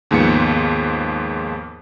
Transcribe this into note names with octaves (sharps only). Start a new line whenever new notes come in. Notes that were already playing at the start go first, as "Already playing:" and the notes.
D#2 G#2 F3 B3 C#7